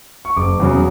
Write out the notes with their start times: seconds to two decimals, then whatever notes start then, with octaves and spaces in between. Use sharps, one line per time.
0.25 C#6
0.37 F#1 D6
0.60 E2 C#3 F#3